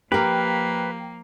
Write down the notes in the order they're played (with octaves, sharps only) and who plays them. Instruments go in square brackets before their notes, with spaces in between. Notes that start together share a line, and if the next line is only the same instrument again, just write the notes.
[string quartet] F3 A#3 [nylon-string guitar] G4 A#4 [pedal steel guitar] B4 [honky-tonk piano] G5